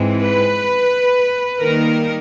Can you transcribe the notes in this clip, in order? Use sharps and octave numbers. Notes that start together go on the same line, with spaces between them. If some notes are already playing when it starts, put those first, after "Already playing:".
Already playing: G#2 E3 G#3 C4
B4
D#3 G3 A#3 D#4 A#4